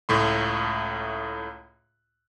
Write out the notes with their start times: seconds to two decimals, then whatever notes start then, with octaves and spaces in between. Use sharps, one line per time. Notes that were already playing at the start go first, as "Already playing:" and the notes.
0.09 C#2 A2 A3 C6